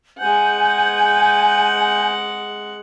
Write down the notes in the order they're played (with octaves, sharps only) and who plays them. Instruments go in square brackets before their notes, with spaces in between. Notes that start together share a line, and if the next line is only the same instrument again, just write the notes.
[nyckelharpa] G#3 F#5 [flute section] G#5 G6